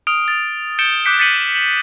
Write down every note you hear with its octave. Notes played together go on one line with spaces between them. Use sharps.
D#6 F6 D7
A6 D7
G6 A6 C#7 D7 E7 G7
D6 F#6 G6 B6 C#7 D7
G6 A6 B6 C#7 D#7 F#7
F#7